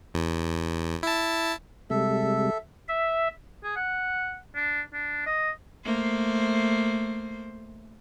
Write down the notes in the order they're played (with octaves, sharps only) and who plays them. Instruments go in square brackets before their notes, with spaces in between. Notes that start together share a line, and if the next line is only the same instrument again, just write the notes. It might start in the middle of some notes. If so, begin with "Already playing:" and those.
[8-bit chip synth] E2
E4 A5
[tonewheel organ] C3 G3 G#3 [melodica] A4 E5
[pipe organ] E5
[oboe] G#4
F#5
D4
D4
D#5
[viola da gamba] A3 A#3 C5